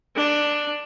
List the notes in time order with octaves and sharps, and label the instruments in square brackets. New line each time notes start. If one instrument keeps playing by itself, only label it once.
[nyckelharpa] D4